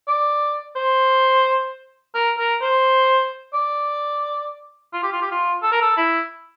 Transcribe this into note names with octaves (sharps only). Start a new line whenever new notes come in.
D5
C5
A#4
A#4
C5
D5
F4
G4
F4
G4
F4
A4
A#4
A4
E4